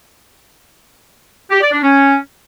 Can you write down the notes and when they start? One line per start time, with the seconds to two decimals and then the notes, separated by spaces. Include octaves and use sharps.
1.51 G4
1.61 D5
1.72 D4
1.83 C#4